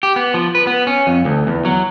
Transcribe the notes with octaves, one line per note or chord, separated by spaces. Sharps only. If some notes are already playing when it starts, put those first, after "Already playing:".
G4
B3
F3
B4
B3
C#4
F2
D2
E2
F#3